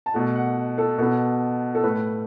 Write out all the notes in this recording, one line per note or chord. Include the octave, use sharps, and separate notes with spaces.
A5
B2 A3 F#5
F#5
A4
B2 B3 A4
A4
A2 A3 B4